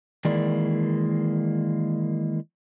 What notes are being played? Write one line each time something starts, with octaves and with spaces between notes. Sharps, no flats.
D#3 E3 G#3 A#3 D5